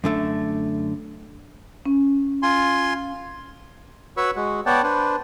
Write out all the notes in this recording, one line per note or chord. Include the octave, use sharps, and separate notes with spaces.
F#2 D3 A3
C#4
F4 G#5 C6
F#4 B4 C#5 B5 C#6 E6
G#3 F#4
B3 C#5 D5 F#5 G5 A5
D4 B4 C5